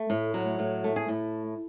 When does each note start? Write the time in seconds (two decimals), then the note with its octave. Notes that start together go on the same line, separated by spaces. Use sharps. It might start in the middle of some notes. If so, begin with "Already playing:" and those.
Already playing: A3
0.10 A2
0.34 F#3
0.59 A2
0.84 A3
0.96 G#4
1.08 A2